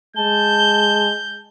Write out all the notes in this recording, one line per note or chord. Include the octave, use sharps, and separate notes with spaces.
G#3 A5 G6 G7